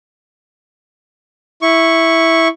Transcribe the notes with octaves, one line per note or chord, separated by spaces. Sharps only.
E4 C#6